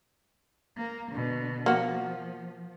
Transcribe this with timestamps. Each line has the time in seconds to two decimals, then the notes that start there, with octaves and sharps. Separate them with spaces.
0.77 A#3
1.11 B2 D3
1.66 F3 A#3 F#4